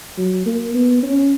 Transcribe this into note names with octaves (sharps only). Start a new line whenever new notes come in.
F#3
A#3
B3
C#4